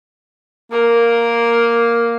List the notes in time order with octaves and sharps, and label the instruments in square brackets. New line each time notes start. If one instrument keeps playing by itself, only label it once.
[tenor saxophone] A#3 [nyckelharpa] A#4